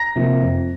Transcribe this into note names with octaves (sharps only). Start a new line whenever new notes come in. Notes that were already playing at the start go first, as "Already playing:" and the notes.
Already playing: A#5 A#6
C3 F3 A#3
F2